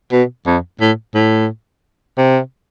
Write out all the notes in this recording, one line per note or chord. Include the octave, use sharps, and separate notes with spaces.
B2
F2
A2
A2
C3